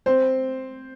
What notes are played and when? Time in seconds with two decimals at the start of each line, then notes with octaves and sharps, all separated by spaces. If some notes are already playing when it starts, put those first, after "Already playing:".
0.06 C4 C5